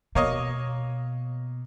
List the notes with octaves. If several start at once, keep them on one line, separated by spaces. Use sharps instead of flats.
B2 A#3 C#5 D#5